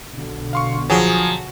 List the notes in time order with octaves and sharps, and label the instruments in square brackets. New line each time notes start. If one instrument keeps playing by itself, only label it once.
[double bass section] B1 B2 D3
[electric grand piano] F5 C6 C#6
[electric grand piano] F3 G#4 G#5 [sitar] F#3